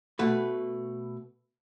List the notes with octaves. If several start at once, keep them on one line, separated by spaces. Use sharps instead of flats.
B2 A3 B4